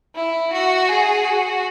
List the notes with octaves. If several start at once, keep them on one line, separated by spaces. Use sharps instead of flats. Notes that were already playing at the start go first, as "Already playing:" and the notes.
E4
F#4
G#4
F#4